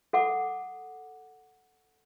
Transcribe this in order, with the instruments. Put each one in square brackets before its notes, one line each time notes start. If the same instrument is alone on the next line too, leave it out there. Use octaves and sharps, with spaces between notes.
[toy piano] A4 F#5 D6